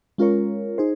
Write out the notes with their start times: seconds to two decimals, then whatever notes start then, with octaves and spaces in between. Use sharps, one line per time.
0.18 G#3 C#4 F4 A#4 C#5
0.78 D#4 G#4 C5